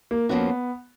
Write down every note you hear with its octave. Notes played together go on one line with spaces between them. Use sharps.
A#3
F2 F3 A#3 B3 C#4 F#4